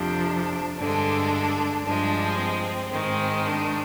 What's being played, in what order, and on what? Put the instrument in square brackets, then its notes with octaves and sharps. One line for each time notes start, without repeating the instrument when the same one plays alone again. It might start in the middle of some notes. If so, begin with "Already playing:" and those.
Already playing: [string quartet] F2 C3 F3 D4
G2 D3 G#3 D4
G2 F3 G#3 D4
C4
G#2 D#3 G#3
D4